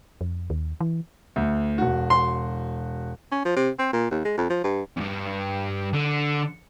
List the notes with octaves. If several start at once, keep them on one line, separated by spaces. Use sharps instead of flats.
F2
D#2
E3
D2
E1 F#4
C6
C#4
F3
C3
C4
A#2
D#2
G#3
F2
F3
G2
E2 G2
D3